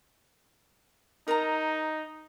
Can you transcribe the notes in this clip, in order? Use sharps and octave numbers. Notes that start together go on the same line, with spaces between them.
D#4 A#4 A5 A#5